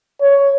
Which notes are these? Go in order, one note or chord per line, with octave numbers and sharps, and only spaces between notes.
C#5